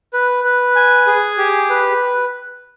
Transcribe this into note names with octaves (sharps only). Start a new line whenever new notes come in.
B4
B4
G#5
G#4
G4
B4